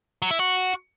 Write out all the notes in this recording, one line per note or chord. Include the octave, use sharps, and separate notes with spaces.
F#3
E4
F#4